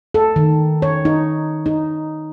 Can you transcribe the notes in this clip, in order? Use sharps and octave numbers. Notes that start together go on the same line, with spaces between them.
A4
D#3
C#5
D#4
D#4